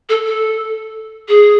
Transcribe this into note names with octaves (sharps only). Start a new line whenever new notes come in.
A4
A4
G#4